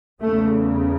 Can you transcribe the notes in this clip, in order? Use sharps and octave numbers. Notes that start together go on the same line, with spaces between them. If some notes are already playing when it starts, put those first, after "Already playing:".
E2 C#3 A3